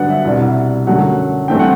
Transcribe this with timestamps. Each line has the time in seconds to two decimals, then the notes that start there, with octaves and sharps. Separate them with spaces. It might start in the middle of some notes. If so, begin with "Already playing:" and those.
Already playing: G2 D3 F#3 B3 D5 F#5
0.10 E5
0.25 C2 B2 G3 D4
0.87 F#2 D3 F#3 A3 F#5
1.48 G2 E3 A3 C4 G5
1.59 F#5